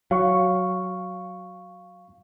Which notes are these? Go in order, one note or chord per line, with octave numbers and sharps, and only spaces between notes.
F#3 F5 C#6